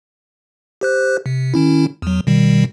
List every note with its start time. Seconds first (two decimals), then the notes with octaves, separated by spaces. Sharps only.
0.81 G4 C5 F#6
1.26 C3
1.54 D#3 C#4 E4
2.02 E2 F#3
2.27 B2 D#3 G3